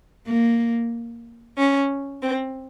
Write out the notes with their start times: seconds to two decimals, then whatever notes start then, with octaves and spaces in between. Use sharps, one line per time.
0.27 A#3
1.57 C#4
2.22 C4